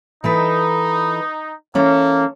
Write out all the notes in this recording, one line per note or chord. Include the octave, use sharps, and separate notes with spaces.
E3 D#4 A4 B4
E3 A#3 C#4 A4